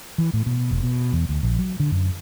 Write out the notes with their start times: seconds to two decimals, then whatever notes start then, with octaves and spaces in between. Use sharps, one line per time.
0.18 E3
0.34 A2
0.46 B2
0.71 F1
0.83 B2
1.13 E2
1.29 D2
1.43 A#1
1.59 F#3
1.80 D3
1.92 F#2